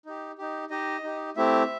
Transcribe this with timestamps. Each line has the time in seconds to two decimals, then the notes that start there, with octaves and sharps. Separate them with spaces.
0.06 D#4 G4
0.38 D#4 G4
0.70 D#4 G4 D#5
1.03 D#4 G4
1.36 A3 C4 E4 G4 E5